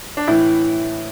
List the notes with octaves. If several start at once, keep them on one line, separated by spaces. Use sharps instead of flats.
D4
A2 E3 E4